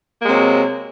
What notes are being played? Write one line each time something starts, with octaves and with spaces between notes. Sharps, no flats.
C3 F#3 G#3 A#3